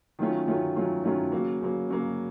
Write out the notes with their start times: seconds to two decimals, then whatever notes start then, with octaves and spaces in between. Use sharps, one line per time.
0.19 D#3 F#3 A3 C#4 F4
0.48 D#3 F#3 A3 C#4 F4
0.76 D#3 F#3 A3 C#4 F4
1.04 D#3 F#3 A3 C#4 F4
1.32 C#3 F#3 A#3
1.61 C#3 F#3 A#3
1.89 C#3 F#3 A#3